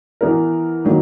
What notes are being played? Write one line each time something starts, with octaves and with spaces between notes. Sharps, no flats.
E3 B3 E4 A#4
D#3 F#3 A#3